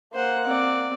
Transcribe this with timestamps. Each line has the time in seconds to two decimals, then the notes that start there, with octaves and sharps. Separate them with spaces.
0.15 A#3 C5 F#5
0.45 C4 D5